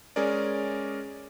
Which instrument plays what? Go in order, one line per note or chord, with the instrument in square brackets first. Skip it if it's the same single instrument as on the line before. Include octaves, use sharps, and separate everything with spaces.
[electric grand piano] G#3 C#4 G#4 A#4 D5